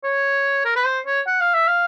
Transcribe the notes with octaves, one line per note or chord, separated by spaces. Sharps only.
C#5
A#4
B4
C5
C#5
F#5
F5
E5
F5